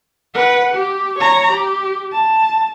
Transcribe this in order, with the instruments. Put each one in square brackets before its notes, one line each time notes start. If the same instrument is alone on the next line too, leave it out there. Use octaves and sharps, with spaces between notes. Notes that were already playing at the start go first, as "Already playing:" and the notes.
[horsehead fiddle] B4 F#5
G4
C#5 A#5
G4
A5